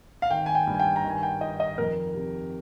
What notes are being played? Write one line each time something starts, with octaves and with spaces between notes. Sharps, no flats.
F5
G#1 G5
G#5
G5
G2
G#5
G5
A#5
D#3
G#5
G5
D#4 D#5
D#5
F2 A#4
C3